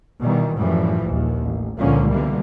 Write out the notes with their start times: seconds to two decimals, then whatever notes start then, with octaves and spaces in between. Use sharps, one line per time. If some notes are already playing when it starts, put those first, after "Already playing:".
0.22 B2 D#3 E3 G3
0.57 F#2 A2 E3 F3 G3
1.07 A#1 D#2
1.42 A1
1.78 C#2 A#2 D3 F3 A#3 C#4
2.10 B2 D3 E3 G3 A#3